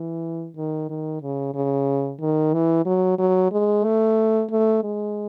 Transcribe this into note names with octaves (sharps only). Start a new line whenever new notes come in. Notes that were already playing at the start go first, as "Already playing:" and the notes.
Already playing: E3
D#3
D#3
C#3
C#3
D#3
E3
F#3
F#3
G#3
A3
A3
G#3